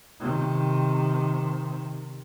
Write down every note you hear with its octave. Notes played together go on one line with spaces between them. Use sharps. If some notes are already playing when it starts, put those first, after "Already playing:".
C3 D#3